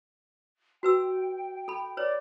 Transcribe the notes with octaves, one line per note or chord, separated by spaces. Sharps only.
F#4 B4 G5 E6
A4 B5
B4 C#5 D5